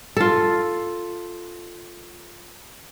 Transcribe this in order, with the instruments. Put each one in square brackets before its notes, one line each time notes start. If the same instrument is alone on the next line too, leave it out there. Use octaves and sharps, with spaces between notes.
[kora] F4 A4